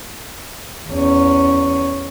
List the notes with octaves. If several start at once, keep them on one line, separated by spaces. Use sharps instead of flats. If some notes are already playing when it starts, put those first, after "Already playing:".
E2 C#4